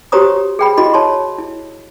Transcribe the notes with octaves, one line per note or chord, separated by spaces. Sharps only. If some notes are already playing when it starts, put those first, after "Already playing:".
F#4 G4 C5 C#5 A#5 D#6
G#4 G5 B5
E4 F#4 D#5 B5
C#5 A5 C6
E4